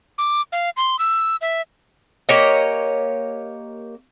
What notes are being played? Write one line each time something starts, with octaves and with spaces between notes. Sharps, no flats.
D6
F5
C6
E6
E5
A#3 G4 C#5 D#5